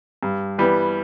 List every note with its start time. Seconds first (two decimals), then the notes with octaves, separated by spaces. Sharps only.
0.23 G2
0.58 E3 G3 B3